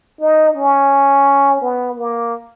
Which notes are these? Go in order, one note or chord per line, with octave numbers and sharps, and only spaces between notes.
D#4
C#4
B3
A#3